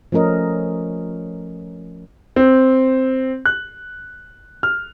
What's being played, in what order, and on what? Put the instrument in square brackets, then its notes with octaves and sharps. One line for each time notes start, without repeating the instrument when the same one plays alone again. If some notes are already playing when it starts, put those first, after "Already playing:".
[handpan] F3 A3 C#4 A#4 D#5
[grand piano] C4
F#6
F6